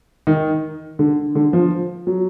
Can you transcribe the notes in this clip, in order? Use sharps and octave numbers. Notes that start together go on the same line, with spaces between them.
D#3
D3
D3
F3
F#3